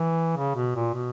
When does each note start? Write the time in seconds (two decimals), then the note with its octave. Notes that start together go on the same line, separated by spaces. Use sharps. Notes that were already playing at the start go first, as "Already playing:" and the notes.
Already playing: E3
0.37 C#3
0.56 B2
0.76 A#2
0.94 B2